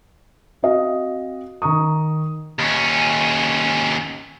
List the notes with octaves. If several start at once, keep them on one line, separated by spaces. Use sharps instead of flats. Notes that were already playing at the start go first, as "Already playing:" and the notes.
C4 F#4 D#5 F5
D#3 A#5 C#6 D#6
D#2 C#4